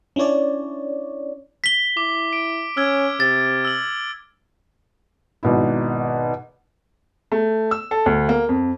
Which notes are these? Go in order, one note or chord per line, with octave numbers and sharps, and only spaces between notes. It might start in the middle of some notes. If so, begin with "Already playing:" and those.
C#4 D4 E4 C#5 D5
B6 G7
E4 D6
D7
C#4 E6 F6 G#6
C3 A6
E6 F#7
G#1 B2 E4
A3
E6
A4
D2
A#3
F2